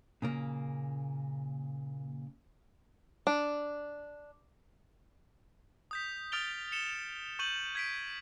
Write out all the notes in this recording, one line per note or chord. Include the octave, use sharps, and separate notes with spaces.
A#2 C#3 A#3
D4
D#6 G6 B6
D#6 F6 A6 D7 F7 G7
C#7 E7 G7
C#6 G6 D#7 F#7
G#6 B6 D7